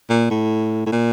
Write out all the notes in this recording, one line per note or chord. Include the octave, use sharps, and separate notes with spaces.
A#2
A2
A2
A#2